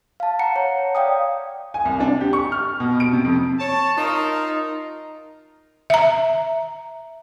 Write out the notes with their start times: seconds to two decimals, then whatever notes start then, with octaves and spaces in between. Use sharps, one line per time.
0.20 F5 A5
0.39 F#5 A#5 C#7
0.56 C#5
0.95 D5 F5 G5 D#6
1.74 G#5
1.85 C2
2.00 D4
2.21 G4
2.33 C#6
2.52 F6
2.80 B2
3.00 D7
3.13 C3
3.25 F2
3.60 C#5 A5
3.97 D#4 F4 A#4
5.90 E5 A#5